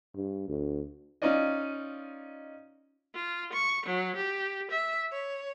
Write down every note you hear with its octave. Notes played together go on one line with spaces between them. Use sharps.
G2
D2
C#4 D#4 F4 D5 D#5
F4
C#6
F#3
G4
E5
C#5